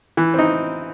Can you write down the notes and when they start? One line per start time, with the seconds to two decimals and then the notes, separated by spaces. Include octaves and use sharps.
0.17 E3
0.34 C4 D#4